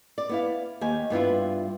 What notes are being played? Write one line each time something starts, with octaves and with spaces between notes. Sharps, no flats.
D5
B3 E4 F5
D#2 G4 G#5
G2 B3 E4 F4